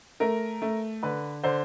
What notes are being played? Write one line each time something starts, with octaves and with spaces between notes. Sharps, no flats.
A3 A#4
A3
D3 B4
D3 C5